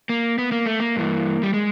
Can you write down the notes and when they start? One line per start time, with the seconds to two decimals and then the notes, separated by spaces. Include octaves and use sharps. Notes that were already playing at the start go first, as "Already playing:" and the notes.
0.09 A#3
0.38 B3
0.52 A#3
0.66 A3
0.80 A#3
0.96 G2 E3
1.43 G3
1.54 G#3